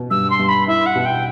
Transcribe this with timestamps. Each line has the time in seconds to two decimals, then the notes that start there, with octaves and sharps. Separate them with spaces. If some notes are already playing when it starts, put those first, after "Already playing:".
Already playing: B2
0.10 G2 E6
0.30 C6
0.39 G2
0.49 B5
0.67 E4 E5
0.86 F#5
0.96 B2
1.05 G5